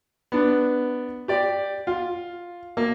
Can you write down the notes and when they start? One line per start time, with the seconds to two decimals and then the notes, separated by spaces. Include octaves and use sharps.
0.32 B3 D4
1.28 G4 D5
1.87 F4
2.77 A#3